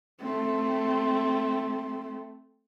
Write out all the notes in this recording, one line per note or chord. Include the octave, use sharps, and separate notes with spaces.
A3 C4